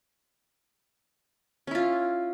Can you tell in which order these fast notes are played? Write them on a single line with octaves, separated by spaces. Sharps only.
C#4 E4 F4